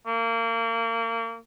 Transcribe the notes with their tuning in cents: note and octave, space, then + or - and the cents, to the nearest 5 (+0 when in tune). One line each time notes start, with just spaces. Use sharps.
A#3 -30